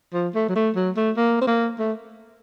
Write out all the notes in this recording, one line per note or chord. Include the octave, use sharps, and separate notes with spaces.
F3
A3
F#3
A3
F#3
A3
A#3
C4
A#3
A3